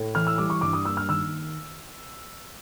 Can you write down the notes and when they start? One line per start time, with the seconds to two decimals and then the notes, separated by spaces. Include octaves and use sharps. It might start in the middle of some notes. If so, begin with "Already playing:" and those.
Already playing: A2
0.15 E3 F6
0.27 E6
0.38 G3 D6
0.50 C#6
0.61 G2 D6
0.73 D#6
0.85 A#3 E6
0.97 F6
1.09 D#3 E6